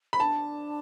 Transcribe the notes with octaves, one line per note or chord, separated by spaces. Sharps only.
B5
D4 A5